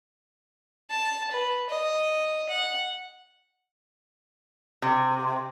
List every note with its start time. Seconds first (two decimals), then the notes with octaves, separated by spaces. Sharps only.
0.90 A5
1.31 B4
1.70 D#5
2.49 F#5
4.82 C3